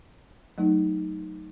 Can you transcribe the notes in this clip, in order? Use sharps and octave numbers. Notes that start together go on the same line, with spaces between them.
F#3 A3 D#4